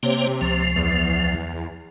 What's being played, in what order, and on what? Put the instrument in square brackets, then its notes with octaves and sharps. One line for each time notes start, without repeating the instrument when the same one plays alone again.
[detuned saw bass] C3 [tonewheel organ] A#3 C5 C#5
[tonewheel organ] C#2 F3
[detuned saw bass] E2